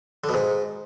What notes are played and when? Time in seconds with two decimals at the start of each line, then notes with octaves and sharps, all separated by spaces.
0.24 D3
0.29 B2
0.34 G#2